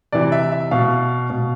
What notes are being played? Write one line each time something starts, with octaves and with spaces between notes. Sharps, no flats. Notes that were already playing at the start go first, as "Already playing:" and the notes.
C3 E3 D5
E5
E5
B2 F5
B2